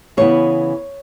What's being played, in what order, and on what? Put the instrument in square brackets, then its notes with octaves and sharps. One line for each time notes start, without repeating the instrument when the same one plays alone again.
[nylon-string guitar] C#3 E3 B3 C#5